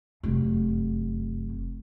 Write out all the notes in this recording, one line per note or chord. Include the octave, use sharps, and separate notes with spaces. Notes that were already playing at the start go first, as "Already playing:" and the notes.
F1 F#2